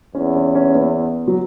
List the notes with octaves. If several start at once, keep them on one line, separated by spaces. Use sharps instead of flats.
E2 C#4
C#4
C#4
B3
F#3